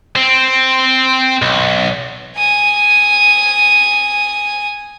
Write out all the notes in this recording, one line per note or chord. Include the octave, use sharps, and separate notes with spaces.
C4
B1
G#5 D#6